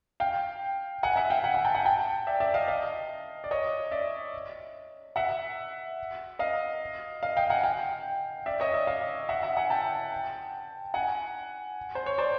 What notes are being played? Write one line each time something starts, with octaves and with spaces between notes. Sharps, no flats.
F5 G5
F#5 G#5
E5 F#5
F5 G5
F#5 G#5
F#5 G#5
G5 A5
F#5 G#5
G5 A5
D5 E5
D5 E5
D#5 F5
D#5 F5
D5
C#5 D#5
D5 E5
E5 F#5
D#5 F5
D#5 F5
F5 G5
F#5 G#5
F5 G5
D5 E5
C#5 D#5
D5 E5
D#5 F5
E5 F#5
E5 F#5
F#5 G#5
G5 A5
F#5 G#5
C5
C#5
C5 D5